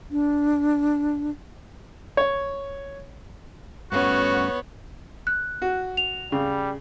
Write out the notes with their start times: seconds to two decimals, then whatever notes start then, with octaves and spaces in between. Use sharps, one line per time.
0.11 D4
2.17 C#5
3.92 G2 A3 B3 C#4 F#4 C#5
5.27 F#6
5.62 F#4
5.97 F7
6.32 C#3 G3